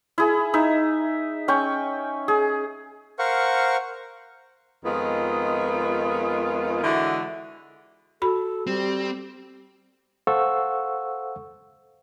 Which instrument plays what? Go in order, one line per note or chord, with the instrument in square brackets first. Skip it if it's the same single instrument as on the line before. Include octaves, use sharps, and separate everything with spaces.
[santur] E4 G#4
D#4 E5
C#4 G5 C#6
G#4
[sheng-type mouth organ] A#4 C5 F5 F#5 C#6
[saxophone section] F2 D#3 G#3 B3 F4
D3 E3 G#3 E4 F#4
[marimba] F#4 B5 [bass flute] A4
[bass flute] G3 [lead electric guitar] C4
[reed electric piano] A4 C5 F5 F#5 C#6 E6